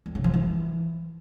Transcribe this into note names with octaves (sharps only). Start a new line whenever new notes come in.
F2
C#3
F3
E3